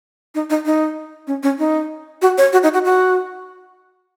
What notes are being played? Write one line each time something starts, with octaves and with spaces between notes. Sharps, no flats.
D#4
D#4
D#4
C#4
C#4
D#4
F#4
C#5
F#4
D#4
F#4
F#4